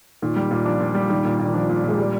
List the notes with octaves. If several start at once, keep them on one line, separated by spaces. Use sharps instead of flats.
A#2 D#3
G3
A#2
F3 D4
A#2
G3
D#3 G3
A#2
A#2
D#3
F3 D4
A#2
A#2
G#3
G3